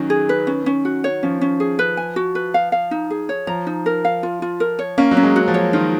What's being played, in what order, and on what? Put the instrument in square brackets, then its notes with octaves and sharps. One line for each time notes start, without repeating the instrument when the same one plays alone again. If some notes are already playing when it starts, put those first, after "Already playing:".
Already playing: [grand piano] D#3 F#3 [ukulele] C#4
[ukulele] G#4
B4
C#4
C#4
F#4
C#5
[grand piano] F3 [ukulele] C#4
[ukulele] C#4
G#4
B4
G#5
F#4
B4
F5
F5
D#4
G#4
C#5
[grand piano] F3 [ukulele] A#5
[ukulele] D#4
A#4
F5
F4
F4
A#4
C#5
[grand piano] A#3 [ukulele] C#4
[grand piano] F#3
[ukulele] C#4
[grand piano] G#3
[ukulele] F#4
[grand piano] F3
[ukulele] C#5
[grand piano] D#3 [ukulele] F4